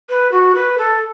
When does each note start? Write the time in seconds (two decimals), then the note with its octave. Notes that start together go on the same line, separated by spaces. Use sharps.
0.09 B4
0.31 F#4
0.55 B4
0.78 A4